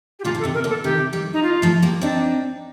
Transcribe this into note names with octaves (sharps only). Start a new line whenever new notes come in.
G4
A#2 D3 F4
D3
A4
C3 D#3
A#4
A#2 D3
A4
C3 D#3 G4
D#3 G3
D#4
F4
F3 A3
G3 A#3
C4 D4 D#4